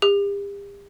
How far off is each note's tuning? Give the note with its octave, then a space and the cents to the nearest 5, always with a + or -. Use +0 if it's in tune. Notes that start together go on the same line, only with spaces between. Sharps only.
G4 +40